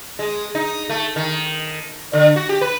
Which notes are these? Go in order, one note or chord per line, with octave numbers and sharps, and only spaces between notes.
G#3
D#4
A3
D#3
D3
F#4
G4
B4